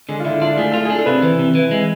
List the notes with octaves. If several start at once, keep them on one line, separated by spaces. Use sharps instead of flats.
D3 G#3
F4
D3 E4
D4 F4
A3 G#4
F4 A4
G#4
D4
A4
C3 B4
E3
C3
E3
G#3